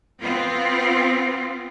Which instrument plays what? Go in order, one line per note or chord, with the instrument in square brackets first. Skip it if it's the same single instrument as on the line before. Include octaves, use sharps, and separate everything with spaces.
[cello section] B3 C4 F4